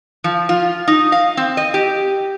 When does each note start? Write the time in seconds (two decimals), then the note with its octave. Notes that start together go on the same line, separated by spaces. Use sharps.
0.24 F3
0.49 F4
0.88 D#4
1.12 F5
1.37 C4
1.57 D#5
1.74 G4